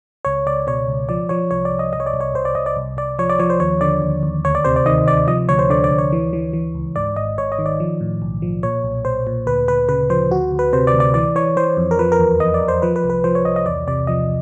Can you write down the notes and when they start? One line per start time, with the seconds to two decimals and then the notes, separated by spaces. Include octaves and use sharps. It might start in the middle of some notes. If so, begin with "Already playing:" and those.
0.25 C#2 C#5
0.46 C#2 D5
0.67 B2 C#5
0.88 C#2
1.09 F3 D5
1.29 F3 C#5
1.51 C2 C#5
1.65 D5
1.72 C2
1.79 D#5
1.93 C2 D#5
2.00 C#5
2.06 D5
2.14 C2
2.20 C#5
2.34 C2 C5
2.45 D5
2.55 C2 D#5
2.66 D5
2.76 C2
2.97 C2 D5
3.19 F3 C#5
3.30 D5
3.39 F3 C#5
3.50 C5
3.60 D#2 C#5
3.81 D3 D5
4.02 D#2
4.23 D#2
4.45 D2 C#5
4.55 D5
4.65 C3 C5
4.76 D5
4.86 D#3 D#5
5.07 C3 D5
5.27 F3 D#5
5.49 D2 C#5
5.59 C5
5.70 D3 D5
5.84 D5
5.91 D2
5.98 C#5
6.12 E3
6.33 E3
6.53 E3
6.75 C#2
6.96 G#2 D5
7.16 G#1 D#5
7.38 G#1 C#5
7.52 D#5
7.59 D#3
7.66 D5
7.80 F3
8.01 A2
8.22 B1
8.42 F3
8.63 A#2 C#5
8.84 B1
9.05 B1 C5
9.27 A#2
9.46 D2 B4
9.68 D2 B4
9.88 C#3 B4
10.10 F3 C5
10.31 D2 F#4
10.52 D2
10.59 B4
10.73 C3 C5
10.87 D5
10.94 D2
11.00 D5
11.14 E3 D5
11.35 E3 C#5
11.57 E3 C5
11.77 F2
11.91 A#4
11.99 F3 B4
12.12 A#4
12.19 E2
12.40 E2 D#5
12.54 D5
12.61 E2
12.68 C5
12.82 F3 B4
12.96 B4
13.04 C2
13.10 B4
13.24 F3 C5
13.35 C#5
13.45 C2 D#5
13.56 D#5
13.66 E2 D5
13.87 C3 D5
14.07 F3 D#5